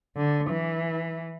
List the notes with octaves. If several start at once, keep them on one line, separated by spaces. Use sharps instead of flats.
D3
E3